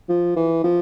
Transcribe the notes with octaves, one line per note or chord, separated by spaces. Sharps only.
F3
E3
F3